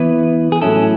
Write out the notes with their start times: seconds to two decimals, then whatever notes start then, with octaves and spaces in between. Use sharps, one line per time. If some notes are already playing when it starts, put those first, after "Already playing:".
Already playing: E3 B3 E4 B4
0.52 G#4
0.62 A2 F#3 C#4 E4 A4